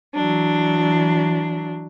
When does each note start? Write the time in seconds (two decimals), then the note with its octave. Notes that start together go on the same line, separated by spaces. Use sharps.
0.14 E3 F#3 D4